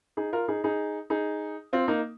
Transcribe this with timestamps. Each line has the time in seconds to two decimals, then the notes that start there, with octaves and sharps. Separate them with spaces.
0.17 D#4 G#4
0.33 F4 A#4
0.48 D#4 G#4
0.64 D#4 G#4
1.10 D#4 G#4
1.73 C4 F4
1.88 A#3 D#4